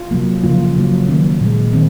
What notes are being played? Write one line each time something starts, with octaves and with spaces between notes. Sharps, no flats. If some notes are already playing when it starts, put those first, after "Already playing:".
Already playing: F4
C3 F#3 A#3
C#3 F3 A#3 F4
C#3 F#3 A#3
D#3 F#3 A#3 C#4
A#2 G#3
D#3 C4